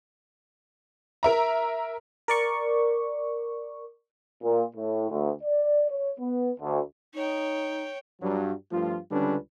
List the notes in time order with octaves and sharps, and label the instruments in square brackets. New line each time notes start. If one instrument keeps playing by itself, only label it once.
[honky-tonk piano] A#4 E5 A#5
[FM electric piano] A#4 D5 C#6
[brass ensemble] A#2
A2
D2
D5
C#5
B3
D2
[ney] D#4 [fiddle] C#5 G5
[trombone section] G2 F#3 G3
G2 F3 A3 F4
C#2 D3 G3 C#4 D4 B4